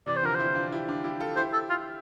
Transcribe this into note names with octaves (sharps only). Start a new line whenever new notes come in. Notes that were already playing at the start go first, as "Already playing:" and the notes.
C3 E3 D5
C5
D3 F3 A#4
C5
C4 E4
D4 F4
E4 G4
D4 F4
E4 G4
F4 A4
E4 G4 C5
A4
F4